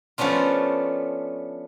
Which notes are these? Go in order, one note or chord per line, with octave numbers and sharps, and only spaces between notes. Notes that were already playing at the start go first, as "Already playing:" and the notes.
F3 A3 B3 C#4 D4 F4